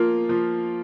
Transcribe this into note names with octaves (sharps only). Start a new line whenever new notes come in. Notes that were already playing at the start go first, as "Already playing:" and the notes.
Already playing: F3 A#3 F4
F3